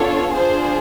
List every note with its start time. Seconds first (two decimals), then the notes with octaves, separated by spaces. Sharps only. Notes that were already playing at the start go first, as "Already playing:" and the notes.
Already playing: B3 D4 F4 A4 C#5
0.35 D4 F4 G#4 C5